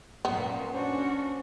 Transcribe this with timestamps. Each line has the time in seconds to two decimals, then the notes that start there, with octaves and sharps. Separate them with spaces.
0.25 F#2 A#2 B3
0.74 C#4 D4 F#4 C5